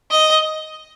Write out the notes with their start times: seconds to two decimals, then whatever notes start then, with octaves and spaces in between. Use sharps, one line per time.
0.11 D#5